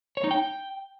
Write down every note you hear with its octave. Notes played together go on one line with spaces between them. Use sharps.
C#5
D#4
G5